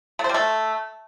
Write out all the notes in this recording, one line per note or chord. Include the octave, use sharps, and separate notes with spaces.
A3
C5
G3
A3